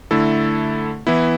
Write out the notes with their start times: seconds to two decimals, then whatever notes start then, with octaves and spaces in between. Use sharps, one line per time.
0.11 D3 A3 E4 A4
1.07 E3 B3 E4